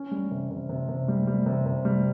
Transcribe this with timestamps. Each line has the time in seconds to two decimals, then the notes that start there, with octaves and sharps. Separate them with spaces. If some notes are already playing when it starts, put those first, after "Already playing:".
Already playing: C#4
0.11 G3
0.31 C3
0.51 C3
0.69 C3
0.89 C3
1.08 G3
1.27 G3
1.46 C3
1.66 C3
1.85 G3